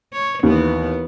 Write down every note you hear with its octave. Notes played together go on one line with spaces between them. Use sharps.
C#5
D#2 E3 B3